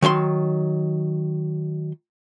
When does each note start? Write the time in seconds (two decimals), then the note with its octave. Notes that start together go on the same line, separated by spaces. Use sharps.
0.02 D#3 F#3 E5 C6